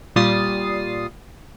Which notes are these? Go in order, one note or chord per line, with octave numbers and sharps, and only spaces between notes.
A#2 G3 F4 D#6 A6 C7